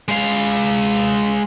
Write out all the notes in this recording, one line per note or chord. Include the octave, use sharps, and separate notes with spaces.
G#3 F5